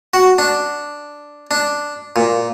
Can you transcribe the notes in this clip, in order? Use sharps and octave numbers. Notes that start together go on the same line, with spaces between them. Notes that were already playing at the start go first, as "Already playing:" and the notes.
F#4
D4
D4
A#2